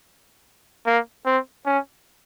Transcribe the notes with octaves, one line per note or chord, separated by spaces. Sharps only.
A#3
C4
C#4